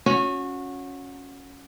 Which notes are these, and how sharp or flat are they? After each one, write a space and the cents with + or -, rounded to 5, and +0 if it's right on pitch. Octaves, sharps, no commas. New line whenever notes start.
C#4 +0 F#4 -25